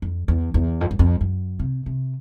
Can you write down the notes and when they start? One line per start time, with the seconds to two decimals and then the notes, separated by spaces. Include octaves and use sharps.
0.02 F2
0.28 E2
0.54 E2
0.81 F2
0.91 F#2
0.99 F2
1.21 F#2
1.59 C3
1.86 C3